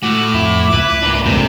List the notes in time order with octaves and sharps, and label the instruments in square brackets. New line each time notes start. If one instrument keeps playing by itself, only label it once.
[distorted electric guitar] A2 [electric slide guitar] F#4 [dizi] D6
[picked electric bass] F2 [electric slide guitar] E4
[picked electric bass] C#2 [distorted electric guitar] B4
[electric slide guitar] G#2 A#3 D4
[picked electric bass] C2 F#2 A3 [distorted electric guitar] C3